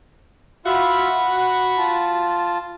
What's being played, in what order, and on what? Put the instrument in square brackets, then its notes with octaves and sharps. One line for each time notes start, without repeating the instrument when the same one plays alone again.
[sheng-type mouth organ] F4 E5 F5 [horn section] F#4 B5
[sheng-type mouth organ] F#5
F4 A5